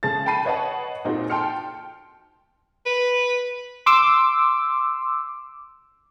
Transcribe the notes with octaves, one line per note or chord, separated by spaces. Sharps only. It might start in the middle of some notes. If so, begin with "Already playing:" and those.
C#3 G#3 G#4 A5 A6
G5 A5 B5 C7 D#7
B4 C#5 D#5 F#5 A5
A#2 C4 D#4 F#4 G#4
G5 A5 C6 F6 C#7
B4
C6 D6 E6